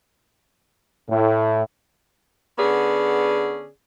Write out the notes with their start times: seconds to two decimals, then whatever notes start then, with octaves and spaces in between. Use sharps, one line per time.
1.09 A2
2.59 D3 B3 C#4 G#4 D5